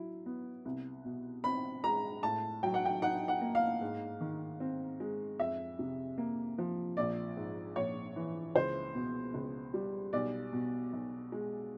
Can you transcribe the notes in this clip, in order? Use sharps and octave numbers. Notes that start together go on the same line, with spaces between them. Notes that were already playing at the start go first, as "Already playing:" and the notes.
Already playing: F#3 E4
B3
C2
B2
C4 B5
G#3 A#5
A2 A5
F#3 G5
F#5
G5
D#4 F#5
F#5
A#3
F5
G#2
D#3
C4
G#3
F2 E5
C3
A#3
F3
A#1 D5
G#2
A#1 C#5
E3
C#2 C5
B2
C#2
G3
B1 D5
B2
B1
G#3